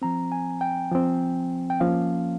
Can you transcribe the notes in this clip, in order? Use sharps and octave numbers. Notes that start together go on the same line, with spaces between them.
F3 C4 A#5
G#5
G5
F3 C4
G5
F3 A#3 C#4 F5